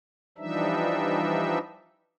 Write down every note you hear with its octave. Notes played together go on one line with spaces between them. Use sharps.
E3 F3 G3 D4 D#4 E5